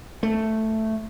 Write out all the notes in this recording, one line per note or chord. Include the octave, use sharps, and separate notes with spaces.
A3